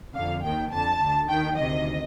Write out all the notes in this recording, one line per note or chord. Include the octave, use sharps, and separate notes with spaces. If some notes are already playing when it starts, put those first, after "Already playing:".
F2 D3 F5
D#2 D#3 G5
F2 D3 A5
D2 D3
D#2 D#3 G5
D2 C3 D#3 D#5